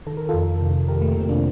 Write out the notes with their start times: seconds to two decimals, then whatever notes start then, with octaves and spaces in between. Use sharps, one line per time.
0.07 D#3 A4
0.17 A#4
0.29 F2 F4 A4
0.61 C3
0.88 D#3 G4 A#4
1.01 A3
1.11 A#3
1.16 C3 C4
1.29 A#3 D4